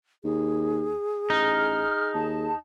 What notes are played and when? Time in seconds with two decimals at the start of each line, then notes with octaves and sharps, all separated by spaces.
0.24 D#2 G#4
1.30 A1 D#4 F6
2.14 D#2 A5